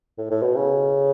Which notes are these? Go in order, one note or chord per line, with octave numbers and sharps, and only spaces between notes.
A2
A2
B2
C#3